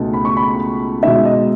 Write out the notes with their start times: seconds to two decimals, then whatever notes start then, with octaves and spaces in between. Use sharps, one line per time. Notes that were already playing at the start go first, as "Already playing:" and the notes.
Already playing: C#2 B2 A3 D#4
0.13 B5
0.25 C#6
0.37 B5
1.03 B2 G#3 D#4 E5
1.25 D#5